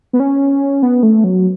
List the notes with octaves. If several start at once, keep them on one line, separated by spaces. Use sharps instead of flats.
B3
C#4
B3
A3
F#3